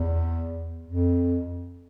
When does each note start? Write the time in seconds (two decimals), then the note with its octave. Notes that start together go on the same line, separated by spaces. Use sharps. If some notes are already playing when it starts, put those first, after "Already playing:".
Already playing: E2
0.88 F2